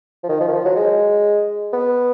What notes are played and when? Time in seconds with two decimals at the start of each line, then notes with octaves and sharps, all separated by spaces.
0.23 F3
0.29 D#3
0.41 F3
0.48 D#3
0.53 F3
0.65 F#3
0.76 G#3
1.73 B3